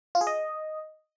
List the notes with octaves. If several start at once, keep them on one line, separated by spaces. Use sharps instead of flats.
F4
G#4
D#5